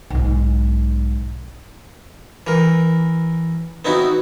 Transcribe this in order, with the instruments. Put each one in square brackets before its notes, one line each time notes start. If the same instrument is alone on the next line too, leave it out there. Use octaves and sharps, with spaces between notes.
[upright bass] B1 G#2
[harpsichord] E3 A#4
B3 C4 D#4 E4 F#4